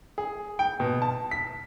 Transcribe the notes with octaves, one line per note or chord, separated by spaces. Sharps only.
G#4
G5
B2
A5
B6